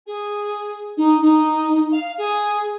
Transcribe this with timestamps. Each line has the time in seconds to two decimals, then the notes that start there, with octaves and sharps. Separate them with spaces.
0.06 G#4
0.97 D#4
1.21 D#4
1.92 F5
2.18 G#4